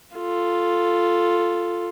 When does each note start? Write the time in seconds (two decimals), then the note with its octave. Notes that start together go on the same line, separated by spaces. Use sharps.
0.16 F4 A4